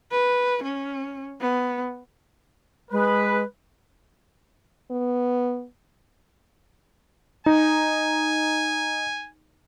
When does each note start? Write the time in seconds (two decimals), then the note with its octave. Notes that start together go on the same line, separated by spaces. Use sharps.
0.12 B4
0.63 C#4
1.41 B3
2.92 G#3 B4
4.91 B3
7.46 D#4 G#5